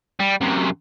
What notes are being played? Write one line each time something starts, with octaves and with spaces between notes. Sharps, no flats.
G3
F#2 C3